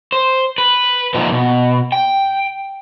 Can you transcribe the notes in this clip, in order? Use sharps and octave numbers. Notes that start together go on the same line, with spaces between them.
C5
B4
A#2 D3 E3 F3 D#4
B2
G5